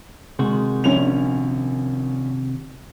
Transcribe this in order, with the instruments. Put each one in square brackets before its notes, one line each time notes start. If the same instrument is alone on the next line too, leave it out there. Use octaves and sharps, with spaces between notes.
[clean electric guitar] C3 D#3 F#4 [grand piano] G#3
[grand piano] A#1 C#4 F7